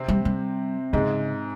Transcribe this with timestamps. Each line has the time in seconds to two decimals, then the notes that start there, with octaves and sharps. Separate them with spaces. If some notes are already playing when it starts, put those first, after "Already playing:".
Already playing: C3 C4
0.08 G3
0.25 G3
0.93 G#2 C#3 G#3